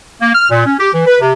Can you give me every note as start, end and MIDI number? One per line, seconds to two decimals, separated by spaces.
0.21 0.29 58
0.33 0.47 89
0.50 0.65 46
0.65 0.73 61
0.78 0.89 67
0.93 1.04 52
1.05 1.17 71
1.21 1.33 48